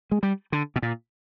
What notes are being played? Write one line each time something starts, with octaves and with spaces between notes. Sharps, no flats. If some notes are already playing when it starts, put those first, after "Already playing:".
G#3
G3
D3
B2
A#2